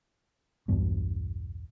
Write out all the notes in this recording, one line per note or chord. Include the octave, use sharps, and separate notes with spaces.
B1 E2 G2 B2